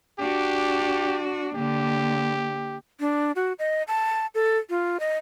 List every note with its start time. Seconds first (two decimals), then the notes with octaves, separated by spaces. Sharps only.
0.19 D4 F#4 G4
1.55 D3 A#3 G4
3.00 D4
3.36 F#4
3.59 D#5
3.88 A5
4.35 A4
4.70 F4
5.00 D#5